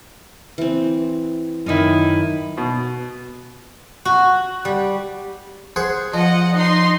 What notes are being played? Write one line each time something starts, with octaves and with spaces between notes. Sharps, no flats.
E3 C4
F#2 D#3 D#4 E4 A#4
B2
F#4
G3
G#4 C5 F#5
F3 D#5 F#5
D#4 C6